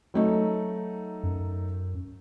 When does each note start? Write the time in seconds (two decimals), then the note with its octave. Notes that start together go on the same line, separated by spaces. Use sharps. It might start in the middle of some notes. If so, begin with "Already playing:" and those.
0.14 F#3 A3 D#4
1.24 F#2